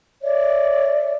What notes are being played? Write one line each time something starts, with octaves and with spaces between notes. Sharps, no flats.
C#5 D5 E5